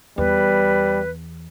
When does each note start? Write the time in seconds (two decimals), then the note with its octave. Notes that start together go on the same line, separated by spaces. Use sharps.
0.18 E2 G3 B4